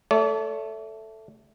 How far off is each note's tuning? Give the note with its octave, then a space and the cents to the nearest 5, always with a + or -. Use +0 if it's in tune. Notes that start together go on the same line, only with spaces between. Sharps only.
A3 +0 D5 -45